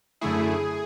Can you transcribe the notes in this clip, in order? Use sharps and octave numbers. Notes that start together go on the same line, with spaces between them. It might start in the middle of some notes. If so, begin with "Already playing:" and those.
F#2 D3 A3 E4 G#4